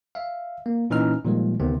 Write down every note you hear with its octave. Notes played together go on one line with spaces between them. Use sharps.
E5 F5
A#3
A#2 E3 C#4 D#4 F6
A#2 D#3 F3 G3 G#3
D2 C3 D#3 B3 C4